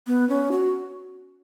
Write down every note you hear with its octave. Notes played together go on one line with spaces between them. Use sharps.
B3
C#4
F#4